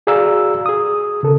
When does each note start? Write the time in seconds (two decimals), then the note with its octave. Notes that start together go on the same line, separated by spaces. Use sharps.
0.07 F#4 G#4 D5 F5 A#5 E6
0.66 G#4 D#6
1.23 C#3 A4 A#4